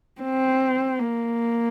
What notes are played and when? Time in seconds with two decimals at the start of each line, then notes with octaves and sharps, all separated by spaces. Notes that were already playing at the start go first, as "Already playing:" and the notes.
0.22 C4
0.99 A#3